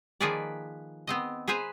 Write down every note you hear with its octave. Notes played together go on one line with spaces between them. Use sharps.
D#3 F3 A#3 G#4 B4 D5
B3 C4 D#5
G#4 B4 C5 G#5 A#5